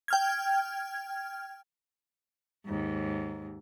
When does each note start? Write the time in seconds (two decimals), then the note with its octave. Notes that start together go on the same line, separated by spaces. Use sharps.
0.08 G5 F6 G#6
2.66 D#2 G#2